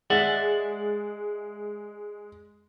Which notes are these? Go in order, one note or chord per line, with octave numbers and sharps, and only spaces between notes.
G#3 D5 E5 F#5